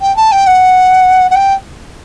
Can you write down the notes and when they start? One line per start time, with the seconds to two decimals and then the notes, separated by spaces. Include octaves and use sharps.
0.02 G5
0.17 A5
0.32 G5
0.47 F#5
1.31 F#5
1.35 G5